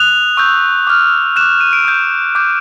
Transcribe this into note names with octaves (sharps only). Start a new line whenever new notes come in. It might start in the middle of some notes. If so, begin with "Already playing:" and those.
Already playing: D#6 F#6 F7
C#6 E6 G6
D6 F6
D6 F#6 E7
D#7
D7
D#6 G6
D6 G6